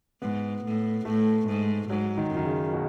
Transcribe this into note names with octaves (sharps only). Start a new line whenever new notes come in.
G#2 B3
A2
A2 A3
G#2
G#2 F#3
D#3
F#2
D#3
C#3
B2